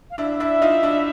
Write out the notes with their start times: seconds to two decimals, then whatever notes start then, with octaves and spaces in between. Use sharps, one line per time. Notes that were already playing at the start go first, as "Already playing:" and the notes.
0.10 F5
0.18 D4 E4 E5
0.40 D4 E4
0.62 D#4 F4
0.83 D4 E4